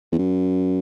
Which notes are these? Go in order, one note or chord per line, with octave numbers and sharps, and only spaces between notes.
E2
F#2